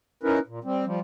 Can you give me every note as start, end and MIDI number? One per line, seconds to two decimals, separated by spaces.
0.23 0.39 61
0.23 0.39 63
0.23 0.39 64
0.23 0.39 70
0.23 0.39 71
0.47 0.59 46
0.64 0.85 55
0.64 0.85 60
0.86 1.00 53
0.86 1.00 55